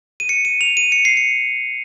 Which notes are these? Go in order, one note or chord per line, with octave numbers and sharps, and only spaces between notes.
D#7
C#7
D#7
F7
D#7
C#7
C7
C#7